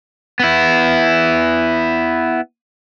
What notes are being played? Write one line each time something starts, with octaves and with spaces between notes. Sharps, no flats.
B3 E4